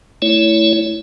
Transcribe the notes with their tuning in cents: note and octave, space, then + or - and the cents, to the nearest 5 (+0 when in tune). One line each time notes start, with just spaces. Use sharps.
A3 +0 E4 +0 C#5 +20